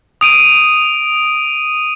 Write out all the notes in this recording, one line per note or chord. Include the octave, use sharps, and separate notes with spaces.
D#6 D7 D#7